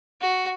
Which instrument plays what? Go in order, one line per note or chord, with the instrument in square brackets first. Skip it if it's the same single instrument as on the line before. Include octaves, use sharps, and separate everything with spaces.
[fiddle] F#4